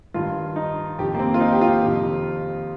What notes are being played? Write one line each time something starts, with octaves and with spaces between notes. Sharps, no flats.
G2 D#3 F4
D#4
F2 C3 D#3 G4
A#3
C4
F4
D#4
G4
F4
F2 C3 D#3